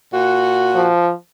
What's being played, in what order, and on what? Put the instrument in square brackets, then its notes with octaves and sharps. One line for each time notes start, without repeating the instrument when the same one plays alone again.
[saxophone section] A#2 F#4
[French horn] F3